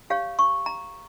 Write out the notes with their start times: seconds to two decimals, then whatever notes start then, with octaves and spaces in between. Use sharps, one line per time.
0.10 G4 C#5 F5
0.39 C#6
0.66 A#5